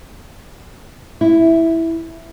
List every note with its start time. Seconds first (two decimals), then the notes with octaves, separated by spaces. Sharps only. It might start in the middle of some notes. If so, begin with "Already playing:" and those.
1.21 E4